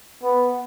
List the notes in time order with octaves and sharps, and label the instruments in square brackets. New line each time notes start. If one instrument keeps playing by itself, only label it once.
[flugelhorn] B3